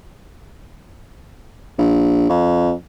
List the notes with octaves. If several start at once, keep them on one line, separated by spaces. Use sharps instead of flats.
A#1
F2